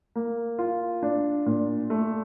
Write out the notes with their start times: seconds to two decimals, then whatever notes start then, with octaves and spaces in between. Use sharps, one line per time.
0.16 A#3
0.59 F4
1.03 D4
1.46 A#2
1.90 A3